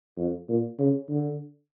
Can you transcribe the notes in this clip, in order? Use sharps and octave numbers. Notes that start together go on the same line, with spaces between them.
F2
A#2
C#3
D3